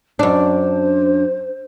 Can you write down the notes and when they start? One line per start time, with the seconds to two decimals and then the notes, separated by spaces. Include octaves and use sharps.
0.19 F#2 D4 C5